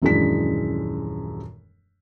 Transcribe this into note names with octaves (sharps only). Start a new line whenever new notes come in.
D#1 F#2 E3 G#3 D4 B6